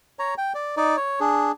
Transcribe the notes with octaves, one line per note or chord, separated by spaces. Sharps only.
C#5 A#5
G5
D5
D#4 D5
C#5
D4 G#4